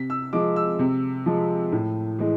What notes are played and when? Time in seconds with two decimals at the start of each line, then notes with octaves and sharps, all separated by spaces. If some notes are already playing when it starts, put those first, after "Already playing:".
Already playing: C3 B6
0.10 E6
0.33 F3 G#3 D6
0.56 E6
0.79 C3
1.26 F3 G#3
1.72 A2
2.19 E3 G#3